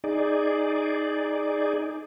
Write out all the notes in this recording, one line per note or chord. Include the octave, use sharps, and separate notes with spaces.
D#4 G#4 D5